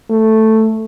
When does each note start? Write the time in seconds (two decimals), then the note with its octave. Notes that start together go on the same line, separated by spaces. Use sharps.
0.11 A3